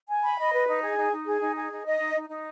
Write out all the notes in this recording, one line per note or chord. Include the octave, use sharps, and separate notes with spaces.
G#5
B5
D#5
B4
D#4
G#4
D#4
D#4
G#4
D#4
G#4
D#4
D#5
D#4
D#4
D#4